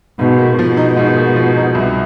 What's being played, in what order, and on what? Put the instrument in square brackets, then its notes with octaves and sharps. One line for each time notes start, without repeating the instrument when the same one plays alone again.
[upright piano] G#2 [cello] B2
[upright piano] A#3
[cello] B2 [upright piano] F3
[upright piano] D#4
G#2
A#3
F3
D#4
C2